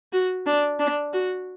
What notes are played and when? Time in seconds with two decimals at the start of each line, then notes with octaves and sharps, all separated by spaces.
0.13 F#4
0.46 D4
0.79 D4
1.13 F#4